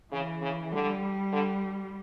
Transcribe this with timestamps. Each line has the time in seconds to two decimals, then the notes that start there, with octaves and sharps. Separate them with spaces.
0.12 C#3 E3
0.41 C#3
0.72 D3 G3
1.32 D3